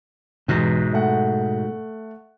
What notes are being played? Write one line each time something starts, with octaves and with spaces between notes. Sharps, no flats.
E2 G#2 B2
A3 F#5